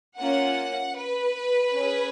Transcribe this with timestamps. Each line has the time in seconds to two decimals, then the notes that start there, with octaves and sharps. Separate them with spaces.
0.18 A#3 C#4 F4 F#5
0.96 B4
1.74 C#4 G#4